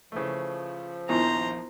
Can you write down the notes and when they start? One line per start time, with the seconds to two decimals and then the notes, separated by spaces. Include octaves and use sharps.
0.12 C#3 E3 F3 A3
1.09 A#1 D#2 B3 E4 F4 C5 A#5